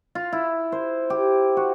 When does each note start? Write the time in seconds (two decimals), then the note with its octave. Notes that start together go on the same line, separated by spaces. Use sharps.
0.15 F4
0.33 E4
0.72 C5
1.10 G4
1.57 F#4